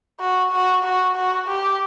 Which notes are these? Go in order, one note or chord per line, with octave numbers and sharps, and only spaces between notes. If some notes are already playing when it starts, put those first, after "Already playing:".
F#4
F#4
F#4
F#4
G4